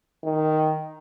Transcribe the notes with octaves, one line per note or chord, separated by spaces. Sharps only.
D#3